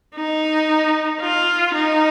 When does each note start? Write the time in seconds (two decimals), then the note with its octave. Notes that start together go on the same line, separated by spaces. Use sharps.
0.15 D#4
1.21 F4
1.74 D#4